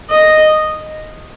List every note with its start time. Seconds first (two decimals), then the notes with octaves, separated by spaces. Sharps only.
0.11 D#5